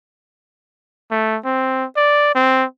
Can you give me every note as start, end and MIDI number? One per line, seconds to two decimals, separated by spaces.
1.11 1.38 57
1.45 1.85 60
1.96 2.33 74
2.35 2.65 60